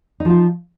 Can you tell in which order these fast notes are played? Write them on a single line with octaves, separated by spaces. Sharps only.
D#4 F3 F4